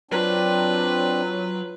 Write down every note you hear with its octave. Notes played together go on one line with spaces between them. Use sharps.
F#3 C4 D4 F4 B4